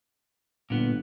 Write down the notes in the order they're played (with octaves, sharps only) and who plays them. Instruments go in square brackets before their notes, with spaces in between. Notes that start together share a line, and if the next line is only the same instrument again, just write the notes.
[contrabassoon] G1 [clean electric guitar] A#2 B3